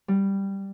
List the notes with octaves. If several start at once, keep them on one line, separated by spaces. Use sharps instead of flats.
G3